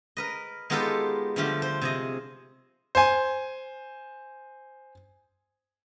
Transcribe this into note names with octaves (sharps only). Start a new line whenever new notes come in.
A#4 B4 D#5
G#3 B3 D#4 F4 G4 A4
D3 F3 G3 A3 F4 G4
C5
C3 G#4 D#5
C5 G#5